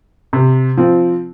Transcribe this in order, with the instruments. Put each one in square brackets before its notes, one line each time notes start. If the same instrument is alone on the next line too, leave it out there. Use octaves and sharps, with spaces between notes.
[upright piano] C3
F3 C4